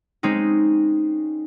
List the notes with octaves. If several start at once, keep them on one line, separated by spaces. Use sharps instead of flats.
G#3 C4 C#4 D#4